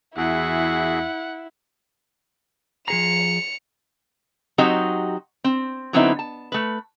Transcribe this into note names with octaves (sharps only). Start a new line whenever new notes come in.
E2 E4 F#4 G#4 E5 F#5
F3 G#4 A#5 C#7 F7
F#3 C4 D#4 F#4 G4 D#5
C4
D3 F#3 B3 C4 D#4 E4
A5
A3 B4